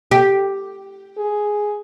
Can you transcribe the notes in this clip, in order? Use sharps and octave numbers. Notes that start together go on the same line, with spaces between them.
G4
G#4